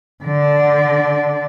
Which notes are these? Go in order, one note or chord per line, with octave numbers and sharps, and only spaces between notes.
D3 D5